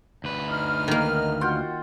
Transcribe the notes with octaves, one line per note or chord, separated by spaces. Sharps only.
D2 B4
D#4 F6
D#3 A#3
F4 F#4 G5